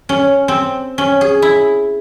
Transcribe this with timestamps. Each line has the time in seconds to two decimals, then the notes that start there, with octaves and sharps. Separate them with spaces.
0.09 C#4
0.48 C4
0.98 C#4
1.21 G#4
1.42 E4